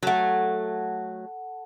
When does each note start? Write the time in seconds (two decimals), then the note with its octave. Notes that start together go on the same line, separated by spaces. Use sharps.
0.03 F#3 A3 A4 F#5